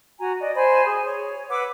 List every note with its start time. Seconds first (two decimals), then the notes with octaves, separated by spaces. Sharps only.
0.19 F#4 G#5 A#5
0.39 D5 D#5
0.55 C5 G#5 B5
0.86 G#4
1.05 C#5
1.50 B4 F#5 D6 E6